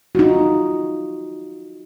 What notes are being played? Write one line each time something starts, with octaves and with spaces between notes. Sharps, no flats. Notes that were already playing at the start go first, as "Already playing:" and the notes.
D#4 F4 F#4